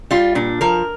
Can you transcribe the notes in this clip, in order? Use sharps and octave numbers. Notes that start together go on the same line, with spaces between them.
G3 F4
A#2 D4
F3 A#4